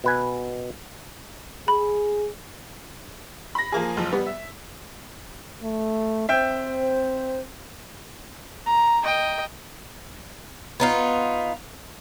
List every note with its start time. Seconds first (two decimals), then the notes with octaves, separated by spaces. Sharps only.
0.04 B2 B4 G#5
1.68 G#4 B5
3.55 B5 A#6
3.72 F3 A#3 G#4
3.97 F#1 F3
4.11 G3 B3
4.26 E5
5.63 A3
6.29 C4 C5 E5 G5 G6
8.66 A#5
9.03 D#5 G5
10.80 B3 D#4 F4